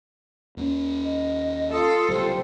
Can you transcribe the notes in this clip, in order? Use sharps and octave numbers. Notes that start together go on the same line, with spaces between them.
D#2 A#3 C#4
D#5
F4 A4 D#6
F#1 C2 F#2 G4 C5